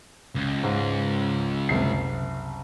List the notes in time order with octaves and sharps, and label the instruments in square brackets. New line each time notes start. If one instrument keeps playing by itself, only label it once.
[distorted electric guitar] C#2
[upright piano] G#2
F#1 C2 C7